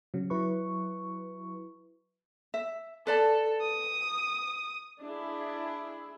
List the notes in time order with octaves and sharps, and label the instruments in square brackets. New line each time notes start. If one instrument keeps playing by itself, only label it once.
[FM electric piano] C#3 F#3
F#3 E4 B4 C#6
[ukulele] E5
[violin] A4 [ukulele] B4 D5 A5
[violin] D#6
[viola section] D4 E4 G#4